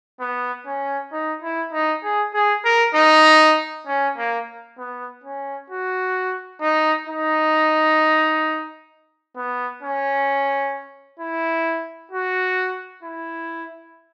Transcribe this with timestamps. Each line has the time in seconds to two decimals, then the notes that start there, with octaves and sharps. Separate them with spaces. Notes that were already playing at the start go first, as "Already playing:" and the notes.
0.20 B3
0.66 C#4
1.12 D#4
1.42 E4
1.73 D#4
2.03 G#4
2.34 G#4
2.65 A#4
2.95 D#4
3.87 C#4
4.17 A#3
4.78 B3
5.24 C#4
5.70 F#4
6.61 D#4
7.07 D#4
9.37 B3
9.83 C#4
11.19 E4
12.11 F#4
13.03 E4